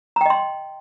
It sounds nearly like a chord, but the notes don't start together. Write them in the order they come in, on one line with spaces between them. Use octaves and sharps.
A#5 G5 D#5 C6